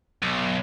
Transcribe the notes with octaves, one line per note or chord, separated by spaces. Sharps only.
B1